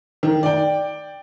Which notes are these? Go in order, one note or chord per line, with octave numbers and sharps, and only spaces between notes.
D#3
D5 G5